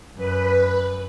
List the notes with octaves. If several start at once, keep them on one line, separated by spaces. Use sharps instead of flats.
F#2 B4